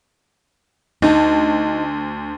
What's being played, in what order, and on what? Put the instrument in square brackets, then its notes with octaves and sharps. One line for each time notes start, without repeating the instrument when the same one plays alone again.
[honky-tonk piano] D2 [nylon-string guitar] D#4